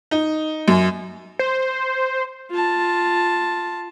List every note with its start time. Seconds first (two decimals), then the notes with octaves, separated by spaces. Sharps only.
0.11 D#4
0.68 F#2
1.39 C5
2.50 F4 A5